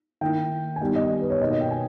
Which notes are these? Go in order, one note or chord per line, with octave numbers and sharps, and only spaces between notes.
D#3 A#3 E4 G5
G#5
D#3 G3 B3 D#4 G5
D#5
B4
C#5
B2 A#3 D#4 D#5
D#5
G5
G#5